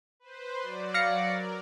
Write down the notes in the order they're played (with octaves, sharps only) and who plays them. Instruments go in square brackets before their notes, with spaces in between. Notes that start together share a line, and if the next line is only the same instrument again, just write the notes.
[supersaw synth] B4 C5
F#3 D5
[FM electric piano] F5 A#6 C#7
[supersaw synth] A#4